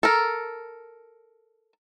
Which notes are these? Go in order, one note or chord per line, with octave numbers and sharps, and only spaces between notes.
A4 A#4